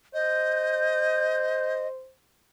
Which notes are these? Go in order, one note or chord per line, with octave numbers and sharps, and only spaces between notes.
C5 D#5 G6